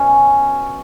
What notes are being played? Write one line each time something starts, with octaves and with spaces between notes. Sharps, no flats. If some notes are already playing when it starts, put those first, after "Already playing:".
Already playing: B2 F#3 C#4